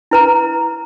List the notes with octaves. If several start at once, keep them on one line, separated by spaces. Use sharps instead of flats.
E4 B4 A#5